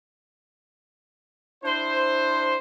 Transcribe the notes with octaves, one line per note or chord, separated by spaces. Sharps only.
D4 E4 C5